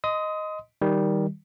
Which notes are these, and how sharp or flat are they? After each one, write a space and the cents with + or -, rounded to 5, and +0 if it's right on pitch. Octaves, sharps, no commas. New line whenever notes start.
D#5 +0 C6 -25 D#6 +20
D#3 +15 G3 +0